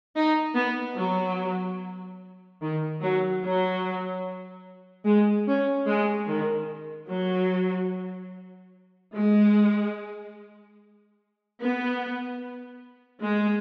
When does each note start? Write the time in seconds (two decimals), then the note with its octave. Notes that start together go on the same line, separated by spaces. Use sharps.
0.16 D#4
0.56 B3
0.97 F#3
2.61 D#3
3.01 F#3
3.43 F#3
5.06 G#3
5.47 C#4
5.87 G#3
6.28 D#3
7.10 F#3
9.14 G#3
11.59 B3
13.23 G#3